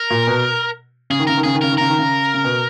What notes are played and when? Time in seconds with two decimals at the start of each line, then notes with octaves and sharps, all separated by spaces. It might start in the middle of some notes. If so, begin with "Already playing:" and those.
Already playing: A#4
0.10 A#2
0.27 B2
1.10 C#3 G#4
1.20 D#3
1.27 C#3 A#4
1.37 D#3
1.43 C#3 G#4
1.55 D#3
1.61 C#3 A#4
1.72 D#3
1.77 C#3 A#4
1.90 D#3
1.99 C#3
2.34 C#3
2.44 B2